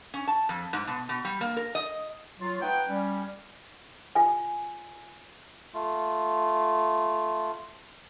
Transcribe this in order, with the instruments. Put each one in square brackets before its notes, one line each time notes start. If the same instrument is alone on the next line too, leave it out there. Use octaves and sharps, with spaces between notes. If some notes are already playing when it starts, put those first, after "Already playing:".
[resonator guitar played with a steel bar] C#4
A5
F2
G#2
B2
B2
G3
A#3
A#4
D#5
[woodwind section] F#3 F4
A3 D#4 B4 F#5 G5
G3 C#4
[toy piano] F4 G#5
[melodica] A3 F4